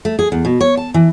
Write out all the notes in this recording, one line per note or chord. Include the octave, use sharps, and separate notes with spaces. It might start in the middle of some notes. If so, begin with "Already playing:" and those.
A3
G#4
E2
B2
C#5
A5
E3